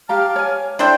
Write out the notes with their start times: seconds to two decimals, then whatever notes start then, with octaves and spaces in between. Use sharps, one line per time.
0.09 G4 F5 A5 A#5 D6 F6
0.36 C#5 G#5
0.79 D4 E4 A4 C5 G5